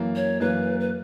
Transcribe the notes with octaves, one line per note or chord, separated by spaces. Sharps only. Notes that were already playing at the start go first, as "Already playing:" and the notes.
Already playing: F#2 E3 A#3
C#5
F#2 E3 A#3 B4
B4